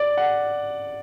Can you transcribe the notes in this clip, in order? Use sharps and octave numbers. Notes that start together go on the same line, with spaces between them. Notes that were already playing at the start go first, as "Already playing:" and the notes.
Already playing: D5
F#5